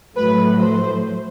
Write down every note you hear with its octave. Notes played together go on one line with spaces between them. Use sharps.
A2 F#3 A3 B4
C5